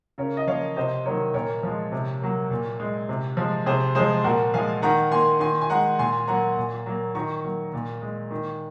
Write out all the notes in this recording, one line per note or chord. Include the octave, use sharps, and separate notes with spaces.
C#3 A#4 C#5
D#5
F3 A#3 C#5 F5
C3 C5 D#5
D#3 F#3 A#3 A#4 C#5
A#2 A#4 C#5
F3 G#3
C3
F#3 A#3
A#2
G#3
C3
F3 G#3
C3 G#4 C5
F3 G#3 G#4 C5
A#2 F#4 A#4
F3 G#3 F5 G#5
D#3 F#5 A#5
A#3 G#5 C6
D#3 G#5 C6
G#5
G#3 F#5 A#5
A#2 G#5 C6
F#3 A#3 F#5 A#5
A#2
F#3 A#3
D#3 A#5 C#6
F#3 A#3
A#2
G#3
D#3